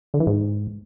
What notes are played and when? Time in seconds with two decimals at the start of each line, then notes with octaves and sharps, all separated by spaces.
0.14 D3
0.20 E3
0.27 G#2